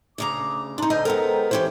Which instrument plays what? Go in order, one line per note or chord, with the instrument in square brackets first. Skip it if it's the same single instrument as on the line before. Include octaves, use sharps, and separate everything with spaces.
[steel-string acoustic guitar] D2 C#3 A#5 [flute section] D6 D#6
[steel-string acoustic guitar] D4 D#4 [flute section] D#5 A#5 C6
[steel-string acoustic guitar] D2 D#5 G#5 [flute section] G6
[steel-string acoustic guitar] G#3 B3 A#4 [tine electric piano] A4 [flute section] C5 G5 A#5
[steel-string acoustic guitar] E3 C#4 G4 [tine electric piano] C5